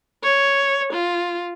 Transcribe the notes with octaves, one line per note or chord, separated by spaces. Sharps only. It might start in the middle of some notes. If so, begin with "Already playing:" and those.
C#5
F4